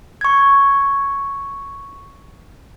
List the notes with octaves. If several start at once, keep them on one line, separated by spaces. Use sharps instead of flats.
C#6 G#6